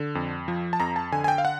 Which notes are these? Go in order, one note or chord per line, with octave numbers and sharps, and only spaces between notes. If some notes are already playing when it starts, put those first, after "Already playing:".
Already playing: D3
F2
F3
A5
F2 A#5
A5
D3 G#5
G#5
G5
F5
F#5